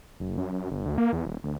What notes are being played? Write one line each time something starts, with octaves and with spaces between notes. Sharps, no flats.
F#1
F#2
F#2
G1
D2
A#3
E2
D#1
D2